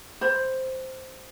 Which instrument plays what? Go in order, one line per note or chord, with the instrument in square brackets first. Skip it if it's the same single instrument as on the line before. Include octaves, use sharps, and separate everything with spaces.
[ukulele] C5 B5